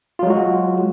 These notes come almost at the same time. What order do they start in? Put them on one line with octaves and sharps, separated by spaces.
F4 F#3 G#3 F#4